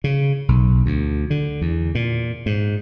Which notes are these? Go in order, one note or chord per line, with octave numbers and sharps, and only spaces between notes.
C#3
B1
D2
D3
E2
A#2
G#2